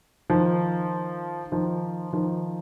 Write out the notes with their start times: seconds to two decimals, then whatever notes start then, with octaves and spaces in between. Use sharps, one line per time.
0.30 D#3 F3
1.52 D#3 F3
2.13 D#3 F3